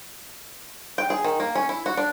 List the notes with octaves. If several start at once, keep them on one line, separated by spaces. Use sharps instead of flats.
G5
G#4
D#3
A#3
C#4
E4
F#4
D4